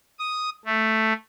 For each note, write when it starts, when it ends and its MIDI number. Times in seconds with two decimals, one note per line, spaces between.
0.19 0.50 87
0.65 1.13 57